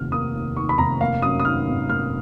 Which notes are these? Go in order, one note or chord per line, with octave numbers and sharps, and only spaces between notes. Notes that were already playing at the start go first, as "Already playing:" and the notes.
Already playing: F1 D#2 D#3 A#3 F6
A#3 D#6
D#2
D#3 C#6
B5
F1 A#5
A#3 F5
F#2 D#6
D#6
D#3 F6
G#1
A#3 F6